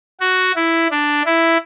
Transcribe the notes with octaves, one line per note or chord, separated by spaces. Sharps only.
F#4
E4
D4
E4